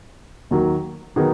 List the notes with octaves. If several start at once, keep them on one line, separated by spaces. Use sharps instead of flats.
D#2 D#3 F#3
D#3 F#3 B3 D#4 G#4